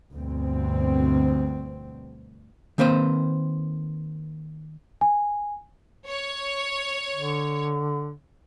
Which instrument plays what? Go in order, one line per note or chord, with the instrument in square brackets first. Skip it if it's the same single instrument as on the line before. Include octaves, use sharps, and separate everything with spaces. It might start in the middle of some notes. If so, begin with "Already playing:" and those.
[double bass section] D2 G2 B2 C4
[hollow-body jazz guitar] D#3 A#3 C4 B4 C5
[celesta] G#5
[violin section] C#5
[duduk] D3